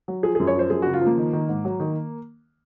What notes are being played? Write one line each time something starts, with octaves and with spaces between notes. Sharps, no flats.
F#3
F3 G#4
F#2 G#4
C#5
F3 C5
F#2 G#4
C#3 F#4
F4
F3
A#3
D#3
D#3
G#2
F#3
D#3